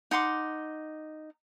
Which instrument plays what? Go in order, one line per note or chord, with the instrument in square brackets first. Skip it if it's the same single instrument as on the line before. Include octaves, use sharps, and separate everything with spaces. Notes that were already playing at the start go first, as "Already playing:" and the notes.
[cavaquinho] D#4 F#5 C6 D6